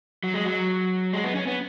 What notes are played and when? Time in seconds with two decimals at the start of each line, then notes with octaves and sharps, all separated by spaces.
0.23 F#3
0.34 G#3
0.46 F#3
1.13 G#3
1.24 B3
1.35 C#4
1.47 B3